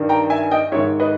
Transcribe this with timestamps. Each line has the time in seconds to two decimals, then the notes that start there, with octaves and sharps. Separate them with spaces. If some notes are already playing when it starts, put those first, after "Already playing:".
Already playing: G2 D#3
0.09 G5 A#5
0.30 E5 G#5
0.51 D#5 G5
0.72 G#2 C#5 E5
0.76 D#3
1.00 B4 D#5